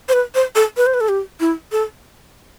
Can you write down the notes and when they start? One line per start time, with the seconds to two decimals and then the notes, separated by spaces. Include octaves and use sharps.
0.09 C5
0.13 B4
0.35 C5
0.56 A4
0.77 B4
0.86 C5
0.94 B4
1.01 A4
1.09 G4
1.40 E4
1.72 A4